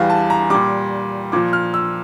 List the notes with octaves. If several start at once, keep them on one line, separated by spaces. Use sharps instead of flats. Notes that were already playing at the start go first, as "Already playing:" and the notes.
Already playing: E2 E3 G3 F5
A5
A#5
A#2 G3 D6
A#2 F3 D6
F6
E6